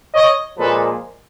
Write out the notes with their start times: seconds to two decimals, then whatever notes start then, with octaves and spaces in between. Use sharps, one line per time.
0.14 C#5 D#5
0.57 A#2 F3 G#3 A4 B4